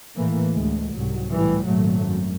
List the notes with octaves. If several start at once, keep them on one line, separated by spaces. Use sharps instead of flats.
A2 E3 A3 A#3
D2 G#3
C2 G#2 F#3
C2 A2 E3 G3
G#1 A#2 F#3 A3
F#2